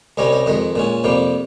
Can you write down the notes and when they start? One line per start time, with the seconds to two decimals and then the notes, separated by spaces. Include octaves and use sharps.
0.17 C2 C3 G3 C#4 D#5
0.32 D#5
0.46 F2 D#3 G#3 D#5
0.75 A#2 G#3 C#4
1.04 F2 C3 G3 A#3